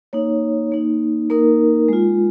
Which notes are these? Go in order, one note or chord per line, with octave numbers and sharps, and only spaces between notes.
A#3 D#4 C#5
A#3 D#4
A#3 D#4 A#4
G#3 F4